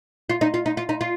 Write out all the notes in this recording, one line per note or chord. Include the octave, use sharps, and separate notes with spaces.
F4
D#4
F4
D#4
F4
D#4
F4